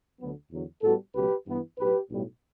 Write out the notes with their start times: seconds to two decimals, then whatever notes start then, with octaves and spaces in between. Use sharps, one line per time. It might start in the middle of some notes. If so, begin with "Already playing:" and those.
0.19 D2 D3 F#3 B3
0.51 E2 D3 F#3
0.83 A2 G3 B3 F#4 A4
1.15 C#2 B2 F#3 A3 G4 B4
1.47 G2 E3 B3
1.78 B1 A2 F#3 G4 B4
2.11 B1 A2 G3